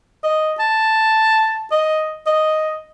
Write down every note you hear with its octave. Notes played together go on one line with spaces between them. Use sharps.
D#5
A5
D#5
D#5